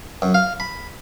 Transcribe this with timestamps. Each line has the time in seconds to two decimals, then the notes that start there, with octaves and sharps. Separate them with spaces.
0.22 F#2
0.34 F5
0.60 B5